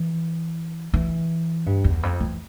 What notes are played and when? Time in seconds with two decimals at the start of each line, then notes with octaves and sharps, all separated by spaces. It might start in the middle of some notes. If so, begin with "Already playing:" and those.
Already playing: E3
0.94 E3
1.66 G2
1.84 E2
2.03 F2
2.20 E3